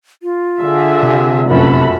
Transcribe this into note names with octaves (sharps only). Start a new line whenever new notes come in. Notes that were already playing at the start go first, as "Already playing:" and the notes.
F4
D3 G#4 E5
C3
F1 A#1 F#2 F#4 A4 B5